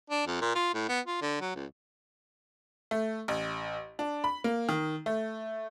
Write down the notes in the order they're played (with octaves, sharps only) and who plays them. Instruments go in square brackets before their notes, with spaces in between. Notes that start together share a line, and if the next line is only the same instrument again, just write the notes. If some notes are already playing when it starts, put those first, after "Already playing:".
[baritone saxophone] D4
F2
A#2
F4
A2
B3
F4
D3
F#3
C#2
[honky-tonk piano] A3
A1
D4
B5
A#3
D#3
A3